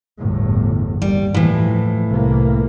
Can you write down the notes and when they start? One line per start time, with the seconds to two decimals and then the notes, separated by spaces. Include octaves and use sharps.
0.18 G1 E2 A2
1.02 D#2 G3
1.34 A2 E3 F3
2.08 C2 C3 A#3